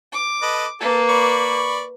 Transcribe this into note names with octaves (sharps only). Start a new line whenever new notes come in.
D6
A4 B4 D#5
A#3 A4 B4
D5 B5 C#6